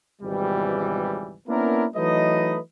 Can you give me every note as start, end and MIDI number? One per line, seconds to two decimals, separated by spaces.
0.22 1.36 32
0.22 1.36 37
0.22 1.36 47
0.22 1.36 52
0.22 1.36 55
1.48 1.85 58
1.48 1.85 59
1.48 1.85 61
1.48 1.85 62
1.48 1.85 64
1.48 1.85 70
1.95 2.57 52
1.95 2.57 54
1.95 2.57 57
1.95 2.57 63
1.95 2.57 71
1.95 2.57 75